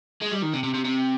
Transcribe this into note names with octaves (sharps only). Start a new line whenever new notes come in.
G#3
G3
D#3
C3
C3
C3
C3